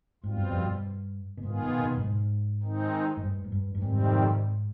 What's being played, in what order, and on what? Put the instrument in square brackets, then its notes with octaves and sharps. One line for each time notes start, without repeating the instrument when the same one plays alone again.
[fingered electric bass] G#2 [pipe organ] B2 G3 C4 F4
[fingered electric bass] G2
F2
G2
B2
[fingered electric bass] G#2 [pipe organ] D#3 B3 F4 G#4
[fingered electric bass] B2
B2
G2
G#2
[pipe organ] D#3 G#3 C4 D#4
[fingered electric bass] G#2
G2
G#2
G2
G2
[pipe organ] F2 C3 D#3 G3 C4 [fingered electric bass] G#2